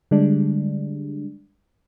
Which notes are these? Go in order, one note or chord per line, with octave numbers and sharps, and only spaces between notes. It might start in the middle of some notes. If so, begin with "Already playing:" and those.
D3 G3 G#3 D4